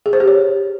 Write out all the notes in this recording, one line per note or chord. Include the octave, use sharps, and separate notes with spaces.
G#4
C5
G4
C#5